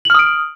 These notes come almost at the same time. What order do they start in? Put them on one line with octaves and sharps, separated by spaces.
F#7 F6 D#6 D7